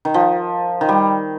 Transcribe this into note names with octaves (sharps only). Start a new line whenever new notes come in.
D#3
F3
D#3
G3